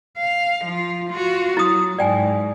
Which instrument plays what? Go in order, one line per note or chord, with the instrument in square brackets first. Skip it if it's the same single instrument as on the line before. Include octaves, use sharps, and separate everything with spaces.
[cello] F5
F3 F4
F4 F#4
[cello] F#3 [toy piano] E4 D#6
[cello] G#2 [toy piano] D5 G5 G#5